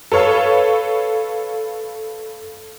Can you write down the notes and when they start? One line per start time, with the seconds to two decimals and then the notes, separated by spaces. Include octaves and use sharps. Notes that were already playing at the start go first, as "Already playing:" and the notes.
0.12 A4 B4 C#5 F5